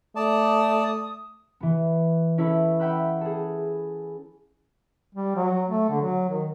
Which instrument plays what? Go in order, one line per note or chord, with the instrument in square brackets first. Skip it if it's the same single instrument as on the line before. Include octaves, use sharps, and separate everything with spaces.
[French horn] A3 [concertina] D5 A5 [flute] D#6
[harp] E3 B3
C#4 E4 A4 B4
E5 F#5 G5 B5 E6 F#6
G#4 A4
[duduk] G3
F#3
A3
D3
F#3
D#3